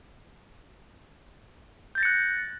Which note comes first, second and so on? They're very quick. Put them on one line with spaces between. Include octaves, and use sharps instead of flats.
G6 A6 A#6 C#7 F#6